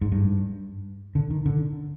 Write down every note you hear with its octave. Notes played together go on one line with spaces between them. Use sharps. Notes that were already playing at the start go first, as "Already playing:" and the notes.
G#2
G2
D3
D#3
D3